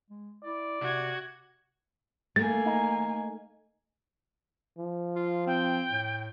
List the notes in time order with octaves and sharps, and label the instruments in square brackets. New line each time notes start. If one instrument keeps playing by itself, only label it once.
[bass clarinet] G#3
[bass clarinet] E4 [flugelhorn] D5
[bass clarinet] C3 [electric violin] F#4 G#6
[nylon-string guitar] A3 [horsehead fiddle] A#3 G#5 [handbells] A6
[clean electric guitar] D#4
[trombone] F3
[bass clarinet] F4
[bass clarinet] C4 [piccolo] G5
[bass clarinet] A2